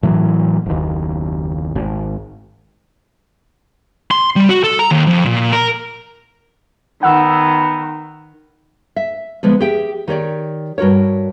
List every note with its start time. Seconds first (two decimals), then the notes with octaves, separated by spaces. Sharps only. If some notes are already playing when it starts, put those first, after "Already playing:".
0.03 A2 E3 F#3
0.66 F#1 D#2
1.76 G#1
4.11 C6
4.36 G3
4.50 F#4
4.64 A4
4.79 A#5
4.91 D#2
5.07 F2
5.25 A#2
5.52 A#4
7.03 D#3 B3 F#5 E6
8.96 E5
9.43 D3 F3 G#3 B3
9.60 G4 G#4 E5 G5
10.08 D#3 G4 C#5 D5
10.78 G2 F#4 A#4 C#5